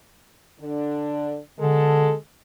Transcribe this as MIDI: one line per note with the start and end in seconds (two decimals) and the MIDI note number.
0.60 1.38 50
0.60 1.38 62
1.60 2.14 47
1.60 2.15 50
1.60 2.14 56
1.60 2.14 69